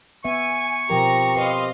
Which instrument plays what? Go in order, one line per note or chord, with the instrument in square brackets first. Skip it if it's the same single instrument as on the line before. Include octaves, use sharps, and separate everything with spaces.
[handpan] B3 E5 [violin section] G#5 [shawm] C#6
[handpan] B2 F3 A#4 [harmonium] C4 G4 [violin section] A#5
[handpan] B4 [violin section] D#5 F5 C6